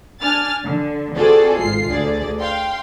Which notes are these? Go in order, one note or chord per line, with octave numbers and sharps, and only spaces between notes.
D4 G#5 F6 A6
D3
C4 F4 F#4 G#4 A4 D5
G#1 G#2 F4 C7
D2 D3 G#4 D5
F5 G5 C6